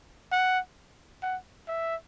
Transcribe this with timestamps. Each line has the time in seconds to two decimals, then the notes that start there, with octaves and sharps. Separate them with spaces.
0.32 F#5
1.22 F#5
1.68 E5